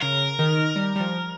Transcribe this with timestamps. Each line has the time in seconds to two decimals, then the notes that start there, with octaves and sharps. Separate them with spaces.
0.01 C#3 A#4
0.39 D#3
0.76 G3
0.96 G3
1.00 F3